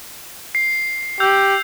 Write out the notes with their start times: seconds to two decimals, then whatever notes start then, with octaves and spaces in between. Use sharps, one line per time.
0.55 C7
1.20 G4 E6 G6 F7